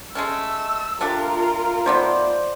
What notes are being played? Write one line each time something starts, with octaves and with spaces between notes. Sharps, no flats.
G#3 A3 C#4 E6
A3 D4 F4 G4 A#4
D#3 A3 B3 C5 D5